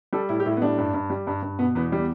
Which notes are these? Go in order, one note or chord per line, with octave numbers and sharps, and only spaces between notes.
G3 A4
A2 E4
G4
A2 E4
B3
G3 D4
G2
G2
G3
G2
G2
B2 B3
E2 B3
G3